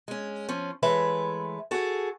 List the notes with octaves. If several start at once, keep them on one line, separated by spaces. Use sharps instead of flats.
G#3 C#4
F3 C#4
E3 G#3 A3 B4 C#5 E5
F#4 G#4 A4